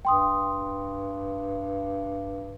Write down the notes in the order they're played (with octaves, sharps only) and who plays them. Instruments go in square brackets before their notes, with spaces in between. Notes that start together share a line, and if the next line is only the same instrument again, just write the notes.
[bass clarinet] G2 [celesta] G5 C6 D#6